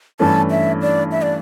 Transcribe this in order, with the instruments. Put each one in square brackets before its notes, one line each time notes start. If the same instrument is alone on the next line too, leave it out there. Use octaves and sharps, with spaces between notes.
[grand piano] G2 E3 A3 C#4 [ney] A5
[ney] E5
D5
E5
D5